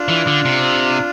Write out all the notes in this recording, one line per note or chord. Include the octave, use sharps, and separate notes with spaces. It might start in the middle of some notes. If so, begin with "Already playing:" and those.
Already playing: D4 F4
E3
D3
C3